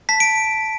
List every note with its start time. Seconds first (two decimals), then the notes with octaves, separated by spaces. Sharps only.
0.09 A5 B6
0.20 D7